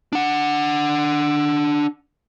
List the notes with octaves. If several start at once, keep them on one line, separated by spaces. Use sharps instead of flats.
D4 F#5